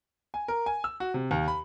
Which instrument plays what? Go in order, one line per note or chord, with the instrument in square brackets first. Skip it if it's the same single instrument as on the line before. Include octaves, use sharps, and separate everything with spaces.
[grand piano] G#5
A#4
G#5
E6
F#4
C3
D#2
B5